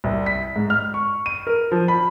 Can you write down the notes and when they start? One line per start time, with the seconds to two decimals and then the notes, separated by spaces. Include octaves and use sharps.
0.04 C2
0.26 B6
0.56 G#2
0.70 F6
0.94 C#6
1.26 D#7
1.47 A#4
1.71 F3
1.88 B5